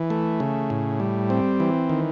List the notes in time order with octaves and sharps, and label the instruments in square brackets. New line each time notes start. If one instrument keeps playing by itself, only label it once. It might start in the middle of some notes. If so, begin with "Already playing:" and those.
Already playing: [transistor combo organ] E3
A3
C#3
A2
G3
C4
E3
D#3